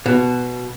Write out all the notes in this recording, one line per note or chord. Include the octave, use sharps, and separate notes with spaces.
B2